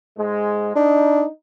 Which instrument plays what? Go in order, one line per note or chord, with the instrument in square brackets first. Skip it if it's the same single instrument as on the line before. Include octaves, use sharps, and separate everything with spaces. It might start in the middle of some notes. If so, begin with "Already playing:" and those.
[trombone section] G#2 G#3
[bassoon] D4 [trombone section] D#4